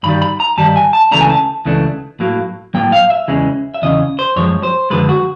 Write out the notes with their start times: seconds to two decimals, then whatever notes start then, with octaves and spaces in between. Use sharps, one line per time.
0.03 G2 D#3 G3 B5
0.22 B5
0.40 A#5
0.57 G2 D#3 G3 A5
0.76 G#5
0.93 A5
1.11 C#2 C#3 E3 A3 D4 A#5
1.21 G#5
1.29 A5
1.65 C#2 C#3 E3 A3 D4
2.20 A2 F#3 A#3
2.74 A2 F#3 A#3 G5
2.92 F5
3.10 E5
3.28 E2 C#3 E3 G#3 C#4
3.74 E5
3.82 E2 C#3 E3 C#4 D#5
4.19 C5
4.36 F#2 D3 F3 G#3 C#5
4.63 C5
4.90 F#2 D3 F3 G#3 B4
5.09 F#4